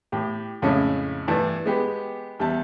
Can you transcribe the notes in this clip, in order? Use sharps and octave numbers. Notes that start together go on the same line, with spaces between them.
A2 G4
F2 A2 C#3 G#3 A3 C#4
G2 E3 A3 D4
G#3 B3 G4
E2 G3 E5 A5